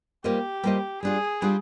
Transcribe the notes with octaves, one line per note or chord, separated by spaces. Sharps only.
G3 A#3 F4 G4 C5 D#5
G3 A#3 F4 C5 D#5
G3 D4 F4 G#4
G3 D4 F4